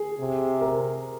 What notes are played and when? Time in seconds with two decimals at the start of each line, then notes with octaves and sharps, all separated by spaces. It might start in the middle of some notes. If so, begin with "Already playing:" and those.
Already playing: G#4
0.20 C3
0.61 A#4